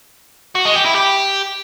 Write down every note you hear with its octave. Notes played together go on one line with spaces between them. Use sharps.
F#4
G#3
G4
E4
G4